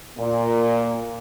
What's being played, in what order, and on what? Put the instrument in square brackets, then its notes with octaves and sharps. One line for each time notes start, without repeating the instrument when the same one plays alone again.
[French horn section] A#2